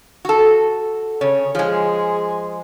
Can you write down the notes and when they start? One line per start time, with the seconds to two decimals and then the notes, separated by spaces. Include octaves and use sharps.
0.25 F#4 A4
1.21 C#3 C#5
1.55 F3 G#3 G#4